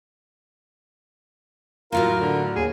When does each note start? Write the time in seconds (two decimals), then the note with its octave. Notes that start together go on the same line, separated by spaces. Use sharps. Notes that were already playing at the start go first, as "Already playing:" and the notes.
1.92 A2 F#3 A#3 F4 A#4
2.19 D3
2.56 D#2 G#4